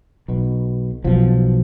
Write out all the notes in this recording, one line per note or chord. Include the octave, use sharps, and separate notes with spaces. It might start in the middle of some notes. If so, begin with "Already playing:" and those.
B1 B2
B1 B2 F3